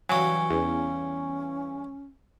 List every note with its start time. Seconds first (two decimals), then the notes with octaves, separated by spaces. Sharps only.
0.09 C#3 E3 F#3 G3 G#5 C#6
0.50 E2 C#4